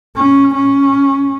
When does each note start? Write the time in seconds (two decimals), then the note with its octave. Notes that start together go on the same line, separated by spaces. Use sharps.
0.16 C#4
0.55 C#4